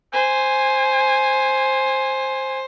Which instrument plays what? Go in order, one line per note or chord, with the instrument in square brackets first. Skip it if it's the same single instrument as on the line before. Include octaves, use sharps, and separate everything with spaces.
[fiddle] C5 [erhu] G#5